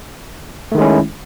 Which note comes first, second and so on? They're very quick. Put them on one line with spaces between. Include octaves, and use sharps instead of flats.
A3 D#3 G#3 C#4 E4